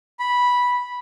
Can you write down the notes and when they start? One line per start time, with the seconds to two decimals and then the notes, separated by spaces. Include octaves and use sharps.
0.19 B5